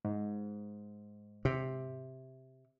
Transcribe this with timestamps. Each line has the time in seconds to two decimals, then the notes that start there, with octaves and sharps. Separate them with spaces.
0.05 G#2
1.45 C3